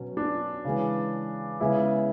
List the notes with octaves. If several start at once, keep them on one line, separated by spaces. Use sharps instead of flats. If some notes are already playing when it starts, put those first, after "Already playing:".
Already playing: B2 F#3 C#4
D4
C#3 E3 G#3 C#4
C#3 G#3 B3 E4